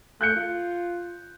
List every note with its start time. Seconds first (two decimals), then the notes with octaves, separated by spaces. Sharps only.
0.21 A3 F#6 G6 C#7
0.36 F4